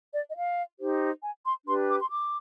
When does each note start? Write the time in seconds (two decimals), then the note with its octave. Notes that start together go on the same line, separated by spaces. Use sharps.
0.12 D5
0.30 D#5
0.35 F5
0.79 D#4 G4 C5
1.23 G#5
1.44 C6
1.66 D4 G4 B4 C6
1.89 D6
2.01 C6
2.11 D6